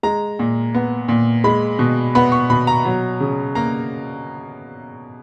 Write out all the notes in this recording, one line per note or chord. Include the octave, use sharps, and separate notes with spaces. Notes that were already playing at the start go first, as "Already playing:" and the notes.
G#3 A#5
A#2
B3
A#2
G#3 B5
B2
B3 B5
C#6
B2 B5
A#5
F#3
C#3
A#3 A#5